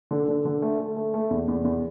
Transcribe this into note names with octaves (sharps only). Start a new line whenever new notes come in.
D3
D3
D3
A3
A3
A3
A3
E2
E2
E2